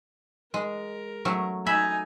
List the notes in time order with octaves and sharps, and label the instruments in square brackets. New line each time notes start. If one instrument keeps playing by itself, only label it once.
[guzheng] G#3 [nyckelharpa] A#4
[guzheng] F#3 A3 C#4
[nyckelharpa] D#4 G#5 [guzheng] E5 B5